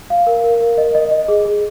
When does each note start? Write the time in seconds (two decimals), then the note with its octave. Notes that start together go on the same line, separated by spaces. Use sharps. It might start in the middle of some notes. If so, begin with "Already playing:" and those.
0.10 F5
0.27 A#4
0.44 A#4
0.61 A#4
0.78 D#5
0.95 D#5
1.11 D#5
1.28 G#4
1.45 G#4